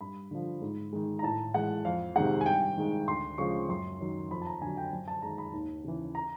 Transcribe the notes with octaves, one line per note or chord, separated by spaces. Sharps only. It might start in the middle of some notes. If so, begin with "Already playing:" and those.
G2 B5
D3 F3
G#2
D#3 G#3
A#5
A2 A5
E3 G#3 F#5
F2 F5
C3 D#3 G#3 F#5
G#5
G2 G5
D#3 G#3
D2 C6
C#3 F3 G#3 C#6
F#2 C6
D#3 F#3
F2 B5
A5
A#5
D3 F#3 G#5
G5
F#2
A5
D#3 G#3 A#5
B5
D#2
C#3 E3
A#5